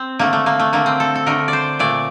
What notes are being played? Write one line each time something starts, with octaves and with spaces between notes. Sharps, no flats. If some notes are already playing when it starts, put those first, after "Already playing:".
Already playing: C4
D3 A3 A#3
A3
A#3
A3
D3 A3 A#3
C4
A4
A4
D3 A3 A#4
D5
C5
A#2 A3 D5